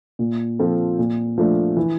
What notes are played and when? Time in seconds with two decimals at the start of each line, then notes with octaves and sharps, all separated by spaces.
0.19 A#2
0.59 F3 C4 F4 A4
0.99 A#2
1.38 F3 A3 D4
1.77 E3